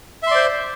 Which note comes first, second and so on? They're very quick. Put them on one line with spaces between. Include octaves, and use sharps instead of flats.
E5 C6 D5 C5